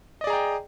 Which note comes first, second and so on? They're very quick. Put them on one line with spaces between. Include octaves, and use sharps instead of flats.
D#5 D5 G#4 A#5 G5